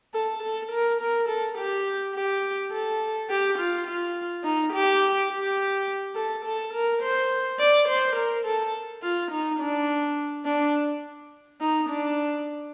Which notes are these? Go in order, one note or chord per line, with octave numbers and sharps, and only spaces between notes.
A4
A4
A#4
A#4
A4
G4
G4
A4
G4
F4
F4
D#4
G4
G4
A4
A4
A#4
C5
D5
C5
A#4
A4
F4
D#4
D4
D4
D#4
D4